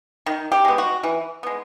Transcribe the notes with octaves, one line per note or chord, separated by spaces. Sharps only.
D#3
G4
G#3 B3
F#4
E3
G#3 B3